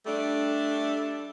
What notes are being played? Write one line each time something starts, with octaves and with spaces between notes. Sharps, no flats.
G3 A3 D4